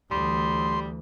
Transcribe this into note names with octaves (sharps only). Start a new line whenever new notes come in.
D2 E3 G3 C6